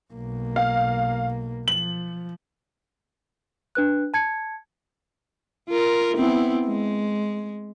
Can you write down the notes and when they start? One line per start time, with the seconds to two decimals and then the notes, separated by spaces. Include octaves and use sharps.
0.13 B1 A#3
0.56 F5
1.68 F3 F#7
3.75 D4 B4 F#6
4.14 A5 G#6 C#7
5.69 F4 A#4
6.17 B3 C4 E4
6.66 G#3